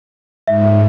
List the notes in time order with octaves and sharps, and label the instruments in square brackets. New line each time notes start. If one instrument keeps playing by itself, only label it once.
[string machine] G#2 [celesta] E5